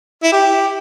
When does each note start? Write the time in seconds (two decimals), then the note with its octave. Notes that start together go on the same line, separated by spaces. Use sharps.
0.23 E4
0.32 G4